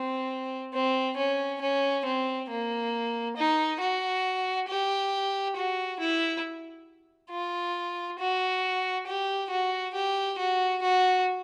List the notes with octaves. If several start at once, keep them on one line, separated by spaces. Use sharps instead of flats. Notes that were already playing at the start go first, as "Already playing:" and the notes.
Already playing: C4
C4
C#4
C#4
C4
A#3
D#4
F#4
G4
F#4
E4
F4
F#4
G4
F#4
G4
F#4
F#4